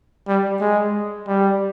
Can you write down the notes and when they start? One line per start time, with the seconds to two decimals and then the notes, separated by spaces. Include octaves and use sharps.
0.28 G3
0.61 G#3
1.28 G3